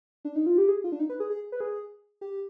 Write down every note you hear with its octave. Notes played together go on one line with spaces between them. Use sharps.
D4
D#4
F4
G4
G#4
F4
D4
D#4
B4
G#4
G#4
B4
G#4
G4